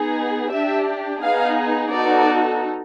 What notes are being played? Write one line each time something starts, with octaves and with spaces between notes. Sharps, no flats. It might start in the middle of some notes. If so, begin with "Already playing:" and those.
Already playing: B3 D#4 G#4
D4 G4 E5
B3 D#4 G#4 F5
B3 D#4 F#4 A4 D5